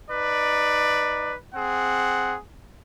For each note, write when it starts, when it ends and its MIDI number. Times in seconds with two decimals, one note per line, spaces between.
0.10 1.35 63
0.10 1.35 71
0.10 1.35 74
1.54 2.36 60
1.54 2.36 68
1.54 2.36 78